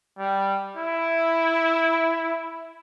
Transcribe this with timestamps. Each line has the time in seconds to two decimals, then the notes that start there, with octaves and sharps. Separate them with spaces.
0.18 G3
0.77 E4